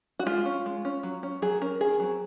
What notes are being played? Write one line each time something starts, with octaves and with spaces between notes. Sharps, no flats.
F#4
G#3 F4
C#4
G#3
C#4
F#3
C#4
F#3 G#4
C#4 A#4
D#3 G#4
F#3 C4